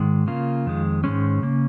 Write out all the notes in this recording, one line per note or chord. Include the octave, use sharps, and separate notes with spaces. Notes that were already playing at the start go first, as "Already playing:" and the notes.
Already playing: G#2 D#3 G#3
C#3 A#3 F4
F2 D#3 G#3
G#2 D#3 G#3 C#4
C#3 A#3